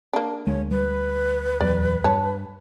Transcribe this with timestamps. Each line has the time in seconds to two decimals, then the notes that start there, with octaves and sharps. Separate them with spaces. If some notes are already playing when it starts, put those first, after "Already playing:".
0.13 A#3 D4
0.47 D2 G#3 C#5
0.71 G3 B4
1.61 D#1 E2 F#3 D5
2.04 G2 C#5 A5